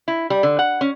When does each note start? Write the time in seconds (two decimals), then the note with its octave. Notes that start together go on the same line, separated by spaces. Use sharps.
0.08 E4
0.30 G3
0.43 D3
0.59 F#5
0.81 C#4